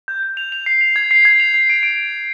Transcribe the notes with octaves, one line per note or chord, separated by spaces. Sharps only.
G6
G6
F7
F7
C7
F7
G#6
C7
G#6
F7
C7
D7
D7